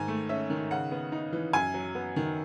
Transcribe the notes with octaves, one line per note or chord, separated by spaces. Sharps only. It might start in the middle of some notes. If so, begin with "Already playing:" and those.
Already playing: G#2 D#3 G#5
A3
C#4 E5
D#3
C#3 F#5
B3
D#4
E3
F#2 G#5
F#3
B3
D#3